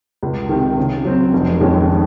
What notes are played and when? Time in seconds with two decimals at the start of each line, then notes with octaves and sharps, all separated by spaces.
0.23 C#2
0.49 C3 D#3
0.78 C#3
1.05 F#3 C4
1.33 F1
1.60 F2 D#3 G#3 C#4